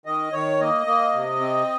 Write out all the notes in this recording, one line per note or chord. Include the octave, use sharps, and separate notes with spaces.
D#3 D#5
D#3 C#5
A#3 D#5
A#3
C3
C4